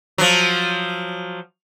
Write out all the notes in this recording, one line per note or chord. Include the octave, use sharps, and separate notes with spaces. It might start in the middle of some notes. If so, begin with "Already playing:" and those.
F3 F#3